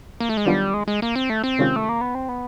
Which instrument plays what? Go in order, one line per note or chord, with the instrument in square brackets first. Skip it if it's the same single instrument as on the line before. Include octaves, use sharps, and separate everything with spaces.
[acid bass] A#3
A3
G#3
[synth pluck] D#3 F#3 B3 D4 F4 [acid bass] G3
[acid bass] G#3
G#3
A#3
C4
A3
C4
[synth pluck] C3 D#3 G#3 C#4 F4
[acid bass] A3
A#3
B3
C4
B3